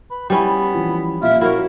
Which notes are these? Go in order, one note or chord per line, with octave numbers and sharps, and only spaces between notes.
B4
G3 B3 C#4 E4
E3 F3
A#2 E5 F5
E4 F#4 A#4 C#5